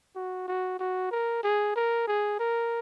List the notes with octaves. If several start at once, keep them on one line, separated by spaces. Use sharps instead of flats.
F#4
F#4
F#4
A#4
G#4
A#4
G#4
A#4